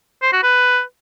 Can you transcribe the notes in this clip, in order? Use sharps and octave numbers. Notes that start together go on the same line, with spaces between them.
C5
F#4
B4